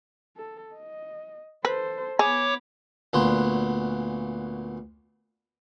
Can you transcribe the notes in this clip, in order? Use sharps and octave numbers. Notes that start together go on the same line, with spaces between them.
A4
D#5
A4 B4 C5
B3 G#4 C#5 B5 D6
D2 A#2 B3 F#4 C6